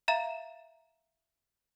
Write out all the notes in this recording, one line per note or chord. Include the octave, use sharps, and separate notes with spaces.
E5 F5 A#5 E7